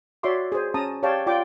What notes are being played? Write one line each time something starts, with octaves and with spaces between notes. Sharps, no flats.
F#4 C#5 D5 E5 C6 D6
G#4 C5
C#4 A5 A#5 D#6
G4 C#5 D5 F5 G5 A5
F4 D5 G5 D6